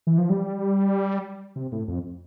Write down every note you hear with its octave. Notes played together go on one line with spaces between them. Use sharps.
E3
F3
G3
C3
A2
F2